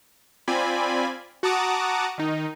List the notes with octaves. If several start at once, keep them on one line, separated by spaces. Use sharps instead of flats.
C4 F4 D5 G#5 B5
F#4 F#5 A5 A#5 D6 D#6
D#3 D#4